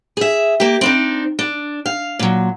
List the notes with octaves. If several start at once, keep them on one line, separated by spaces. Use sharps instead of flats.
G#4 E5
A#3 G4
C4 D4 D#4
D4
F5
A#2 F#3